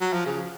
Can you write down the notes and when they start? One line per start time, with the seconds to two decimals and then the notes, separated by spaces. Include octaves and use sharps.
0.01 F#3
0.13 F3
0.26 C#3